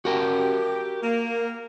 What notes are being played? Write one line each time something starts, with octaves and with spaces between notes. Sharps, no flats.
F#4 G4 A#4 G5
A#3